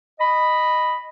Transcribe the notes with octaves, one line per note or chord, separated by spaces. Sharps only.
D#5 B5